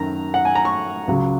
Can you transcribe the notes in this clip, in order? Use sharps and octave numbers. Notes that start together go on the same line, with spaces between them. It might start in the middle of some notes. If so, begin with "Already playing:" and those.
Already playing: F#2 D#3 A#5
F#5
G#5
A#5
C#6
C#2 C#3 F#3